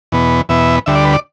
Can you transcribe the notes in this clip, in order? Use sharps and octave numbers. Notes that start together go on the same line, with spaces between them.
E2 B2 B3
E2 B2 B3 E5
D2 D3 G3 E5
D5
B4
D5